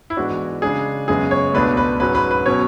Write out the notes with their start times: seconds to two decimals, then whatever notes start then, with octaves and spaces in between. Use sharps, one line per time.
0.10 E4
0.17 G#2 E3 G#3 B3 D4 F#4
0.62 C#3 G#3 D4 G#4
1.08 F#2 C#3 G#3 B3 G#4
1.31 C#5
1.54 C#2 B2 A3 D4 B4
1.77 B4
2.00 G#2 F#3 C#4 B4
2.15 B4
2.31 B4
2.46 B2 F#3 C#4 C#5